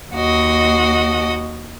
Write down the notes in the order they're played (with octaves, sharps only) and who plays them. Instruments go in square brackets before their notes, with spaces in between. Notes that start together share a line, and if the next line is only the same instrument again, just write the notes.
[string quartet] D#2 F#4 D#5